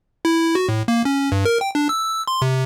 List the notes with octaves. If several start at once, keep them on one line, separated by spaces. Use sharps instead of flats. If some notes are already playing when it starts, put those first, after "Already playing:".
E4
F#4
A2
A#3
C#4
G2
A#4
G5
D4
E6
C6
C3